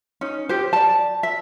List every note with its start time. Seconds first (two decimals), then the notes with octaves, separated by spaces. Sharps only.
0.21 C#4 D#4
0.49 G4 C5
0.73 D5 A5
1.23 E5